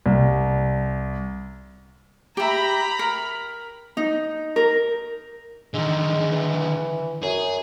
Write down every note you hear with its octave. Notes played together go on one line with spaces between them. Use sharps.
C2
G4 E5 A#5 B5
A#4
D#4
A#4
D3 D#3 G#3
E3
F#2 G#4